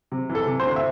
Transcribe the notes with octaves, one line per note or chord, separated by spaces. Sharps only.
C3
E3
A4
C3
C5
D2
E5